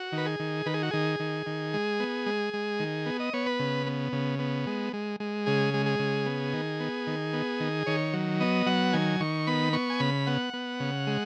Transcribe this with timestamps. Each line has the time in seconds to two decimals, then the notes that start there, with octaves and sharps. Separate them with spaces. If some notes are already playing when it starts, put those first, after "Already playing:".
Already playing: F#4
0.12 D#3
0.18 B4
0.26 G#4
0.40 D#3
0.66 D#3 B4
0.74 G#4
0.83 F#4
0.91 D#3 G#4
1.20 D#3
1.46 D#3
1.73 G#3
2.00 B3
2.26 G#3
2.54 G#3
2.80 D#3
3.06 B3
3.20 D#5
3.33 B3 C#5
3.46 B4
3.60 C#3
3.87 B3
4.12 C#3
4.39 B3
4.67 G#3
4.93 G#3
5.20 G#3
5.46 C#3 G#4
5.74 G#3
5.86 G#4
5.99 C#3
6.26 B3
6.53 D#3
6.80 B3
7.07 D#3
7.33 B3
7.60 D#3
7.86 D#3 C#5
8.13 F#3
8.40 B3 D#5
8.66 F#3 F#5
8.93 D#3 G#5
9.20 D#3 C#6
9.47 B3 B5
9.73 B3 C#6
9.90 G#5
10.00 C#3 B5
10.27 B3 F#5
10.54 B3
10.80 C#3
11.07 G#3